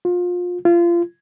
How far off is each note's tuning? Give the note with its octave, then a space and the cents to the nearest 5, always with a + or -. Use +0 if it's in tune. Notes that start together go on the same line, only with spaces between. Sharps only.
F4 +25
F4 -30